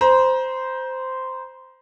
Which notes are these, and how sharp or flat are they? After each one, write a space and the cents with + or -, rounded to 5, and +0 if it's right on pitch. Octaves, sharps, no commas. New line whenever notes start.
C5 -10 A#5 +30